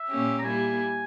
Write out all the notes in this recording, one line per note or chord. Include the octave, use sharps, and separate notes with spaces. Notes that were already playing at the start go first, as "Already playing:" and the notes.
Already playing: E5
A#2 A#3 C#4 G4
A#5
G3 A#3 E4 G#5